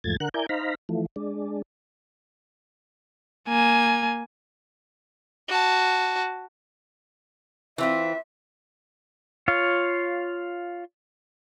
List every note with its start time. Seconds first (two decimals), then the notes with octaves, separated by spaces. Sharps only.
0.04 E2 G#2 F3 A3 G#6 A6
0.20 D3 A#4 F#5 F#6
0.34 E4 A#4 D5 G#5 G6
0.49 D#4 C5 F5 A#5 B5
0.89 E3 F3 A3
1.16 G#3 D4
3.49 A#3 G#5
5.48 F#4 A5
7.78 E3 C4 F4 E5
9.48 F4 C#5 F5